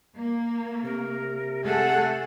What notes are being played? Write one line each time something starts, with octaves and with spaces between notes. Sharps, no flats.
A#3
C3 A#4
A3 G#4 A4 F#5